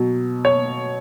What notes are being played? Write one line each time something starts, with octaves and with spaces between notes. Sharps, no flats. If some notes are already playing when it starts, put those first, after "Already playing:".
Already playing: B2 F#3
C#5